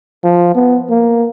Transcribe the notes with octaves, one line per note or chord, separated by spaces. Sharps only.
F3
B3
A#3